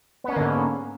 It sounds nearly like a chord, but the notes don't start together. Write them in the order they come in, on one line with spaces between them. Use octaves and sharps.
B3 C#4 A#3 D3 G#2